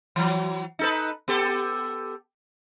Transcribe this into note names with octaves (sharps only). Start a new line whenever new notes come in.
E3 F#3
D#4 A4 B4
B3 G4 A4